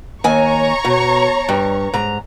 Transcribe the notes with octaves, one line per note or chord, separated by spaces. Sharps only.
D#2 C#5 G#5 A#5 C#6
B2
G2
G#2 A#5